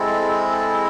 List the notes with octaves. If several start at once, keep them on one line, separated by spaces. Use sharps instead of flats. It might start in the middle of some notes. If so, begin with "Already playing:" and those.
Already playing: G#3 C4 E4 A4
A4